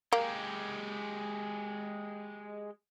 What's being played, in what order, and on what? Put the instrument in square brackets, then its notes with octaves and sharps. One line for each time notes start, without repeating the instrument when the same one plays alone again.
[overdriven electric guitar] G#3 G4 [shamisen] A#3